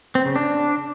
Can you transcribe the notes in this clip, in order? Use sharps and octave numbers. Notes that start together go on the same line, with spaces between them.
C4
C#3
D4